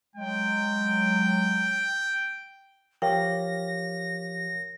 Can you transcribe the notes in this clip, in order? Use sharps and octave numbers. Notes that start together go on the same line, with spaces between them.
F#3 G#3 G5
F3 G4 A#4 C#5 F5 G5 A#6